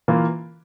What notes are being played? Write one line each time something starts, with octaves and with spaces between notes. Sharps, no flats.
E3 A#3 F4